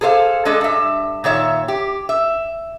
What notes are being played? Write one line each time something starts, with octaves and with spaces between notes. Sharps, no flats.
G#4 A4 C5 E5 F5
G#3 D4 A4 D#5
G2 E5
A#2 D#3 C#5 E5
G4
E5